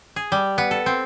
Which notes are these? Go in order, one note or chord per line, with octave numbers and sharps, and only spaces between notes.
G#4
G3
B3
A4
C4